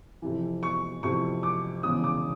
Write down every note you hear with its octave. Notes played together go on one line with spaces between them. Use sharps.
F2 C3 E3
C#6
F2 C3 E3 C#6
D6
E1 E2 C#3 D#6
D6